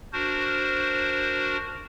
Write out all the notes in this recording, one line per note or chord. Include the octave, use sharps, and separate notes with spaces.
D4 F#4 A#4 C5